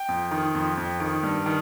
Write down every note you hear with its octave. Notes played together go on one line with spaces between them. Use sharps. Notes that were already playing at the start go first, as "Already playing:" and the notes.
Already playing: G5
F2
D#3
F2
F2
D#3
G2
D#3